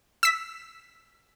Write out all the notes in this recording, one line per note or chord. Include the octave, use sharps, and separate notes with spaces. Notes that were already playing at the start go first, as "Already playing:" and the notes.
E6 B6